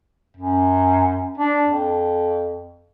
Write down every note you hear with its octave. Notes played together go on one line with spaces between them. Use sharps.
F#2
D4
F2